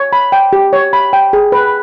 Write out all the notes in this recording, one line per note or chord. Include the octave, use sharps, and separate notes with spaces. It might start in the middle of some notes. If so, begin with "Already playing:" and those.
Already playing: C#5
B5
G5
G4
C#5
B5
G5
G#4
B4